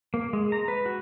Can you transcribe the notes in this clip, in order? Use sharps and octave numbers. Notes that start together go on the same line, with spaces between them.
A#3
G#3
A#5
B4
F#4